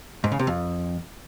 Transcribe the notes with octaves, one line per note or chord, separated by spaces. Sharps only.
G#2
C#3
C3
F2